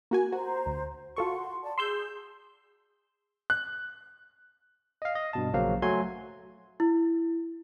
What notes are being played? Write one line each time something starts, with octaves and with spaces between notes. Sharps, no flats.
A#3 F#4 G#5
F#4 C5 A#5
D2
F4 F#4 A4 C6 C#6
D5 A5
G#4 C6 E6 G6
F#6
D#5 F5
D#5
G2 B2 A5
A#1 C#3 F#3 A#3 C5 F5
F#3 A3 F#4 G#5 C6 G#6
E4